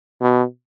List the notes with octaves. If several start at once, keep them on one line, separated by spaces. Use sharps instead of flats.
B2